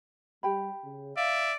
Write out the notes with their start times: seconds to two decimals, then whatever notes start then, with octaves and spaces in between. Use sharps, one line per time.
0.43 G3 G4 G5 B5
0.85 C#3
1.17 D5 E5 F5